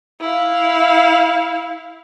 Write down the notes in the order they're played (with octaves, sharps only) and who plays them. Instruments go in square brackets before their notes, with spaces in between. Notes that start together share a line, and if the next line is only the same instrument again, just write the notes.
[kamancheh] E4 F5